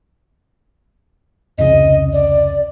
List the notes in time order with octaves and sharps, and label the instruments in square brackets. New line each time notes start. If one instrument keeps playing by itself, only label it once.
[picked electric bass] F1 C#2 C#3 [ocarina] D#5
[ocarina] D5